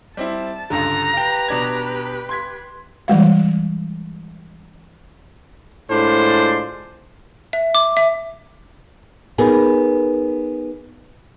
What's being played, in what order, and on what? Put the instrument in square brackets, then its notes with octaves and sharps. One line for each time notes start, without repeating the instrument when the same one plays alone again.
[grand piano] G3 C4 E4 [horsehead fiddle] A5
[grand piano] C#2 G2 D3 [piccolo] A#5
[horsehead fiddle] G4 B4 [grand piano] F5 G5
[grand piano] B2 D4 G#6
C6 G#6 B6
[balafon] E3 G3 G#3 F5
[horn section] A2 G#3 D4 F4 C5
[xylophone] E5
D6
E5
[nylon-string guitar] B3 D#4 G#4 A#4